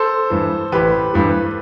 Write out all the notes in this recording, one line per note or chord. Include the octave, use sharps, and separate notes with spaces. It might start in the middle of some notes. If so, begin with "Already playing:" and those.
Already playing: A4 C5
G2 E3
A1 G4 B4
G2 E3